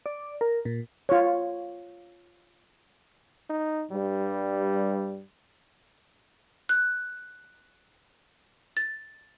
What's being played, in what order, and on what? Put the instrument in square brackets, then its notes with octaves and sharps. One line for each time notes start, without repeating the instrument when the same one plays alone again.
[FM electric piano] D5
A#4
A#2
[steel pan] F4 C#5
[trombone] D#4
[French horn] G2 [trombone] G3
[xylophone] F#6
A6